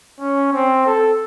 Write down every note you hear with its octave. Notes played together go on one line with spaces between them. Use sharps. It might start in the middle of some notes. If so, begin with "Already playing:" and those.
C#4
C4
A4